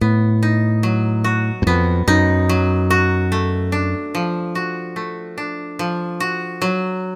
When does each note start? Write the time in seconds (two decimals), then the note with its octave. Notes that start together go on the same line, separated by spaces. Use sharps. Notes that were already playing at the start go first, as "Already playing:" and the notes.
0.01 A2 B3
0.43 D#4
0.83 F#3
1.24 F#4
1.62 F#2
1.67 F2 B3
2.07 F#2 D#4
2.49 F#3
2.90 F#4
3.32 A3
3.72 D4
4.15 F3
4.55 F#4
4.96 A3
5.38 D4
5.79 F3
6.20 F#4
6.62 F#3